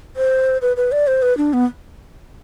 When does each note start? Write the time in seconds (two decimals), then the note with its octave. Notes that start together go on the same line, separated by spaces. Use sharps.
0.16 C5
0.62 B4
0.77 B4
0.92 D5
1.07 C5
1.22 B4
1.37 D4
1.53 B3